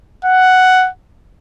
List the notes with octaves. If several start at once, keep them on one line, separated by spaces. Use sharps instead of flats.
F#5